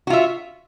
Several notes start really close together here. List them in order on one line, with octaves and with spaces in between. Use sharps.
F#4 F4 E5